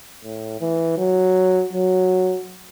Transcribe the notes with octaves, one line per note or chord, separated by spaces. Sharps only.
A2
E3
F#3
F#3